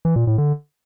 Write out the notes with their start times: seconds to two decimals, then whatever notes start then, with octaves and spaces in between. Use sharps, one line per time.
0.05 E3
0.16 A#2
0.27 A2
0.38 D3